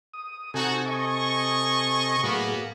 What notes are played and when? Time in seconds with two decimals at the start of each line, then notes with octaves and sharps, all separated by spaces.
0.14 D#6
0.54 C3 D#4 F#4 A4 G#5
0.86 D#5 C#6
2.23 A2 F#3 A#3 B3 G#4